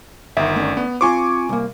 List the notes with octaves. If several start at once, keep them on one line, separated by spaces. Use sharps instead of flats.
G1 D#3 E5
A3 C#4 D4
B3
C4 F4 C5 G#5 C#6 D6
C2 A#3